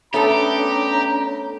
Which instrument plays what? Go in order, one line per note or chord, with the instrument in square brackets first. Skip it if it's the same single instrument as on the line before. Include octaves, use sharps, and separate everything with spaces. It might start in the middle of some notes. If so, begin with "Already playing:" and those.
[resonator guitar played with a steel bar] A3 B3 A4 [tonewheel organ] C#4 D4 C#5 [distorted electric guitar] G4 [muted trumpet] A#5